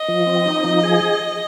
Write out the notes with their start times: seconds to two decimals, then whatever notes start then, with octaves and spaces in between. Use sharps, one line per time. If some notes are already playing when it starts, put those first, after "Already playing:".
Already playing: D#5
0.08 F3
0.27 C4
0.46 D#4
0.64 F3
0.83 G#4